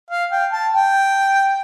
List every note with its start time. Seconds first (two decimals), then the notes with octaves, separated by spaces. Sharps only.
0.11 F5
0.32 G5
0.53 A5
0.74 G5